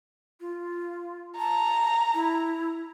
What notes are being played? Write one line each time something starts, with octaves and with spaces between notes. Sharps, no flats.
F4
A5 A#5
E4